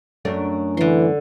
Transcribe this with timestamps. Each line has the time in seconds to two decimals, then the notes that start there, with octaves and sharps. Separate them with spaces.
0.25 F#2 A3 D4
0.77 D3 E3 C6